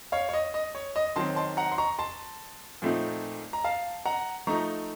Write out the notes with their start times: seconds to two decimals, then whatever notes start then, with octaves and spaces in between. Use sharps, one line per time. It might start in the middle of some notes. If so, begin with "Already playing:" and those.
0.12 C#5 F5
0.29 C#5
0.34 D#5
0.54 D#5
0.75 C#5
0.96 D#5
1.16 D#3 F#3 C4 A5 C6
1.36 A5 C6
1.57 F#5 A#5
1.72 C6
1.78 A#5 C#6
1.99 A5 C6
2.82 A#2 F3 A3 C4 D#4
3.53 A#5
3.64 F5 A5
4.06 F#5 A#5
4.47 F3 A3 D#4 A#5 C#6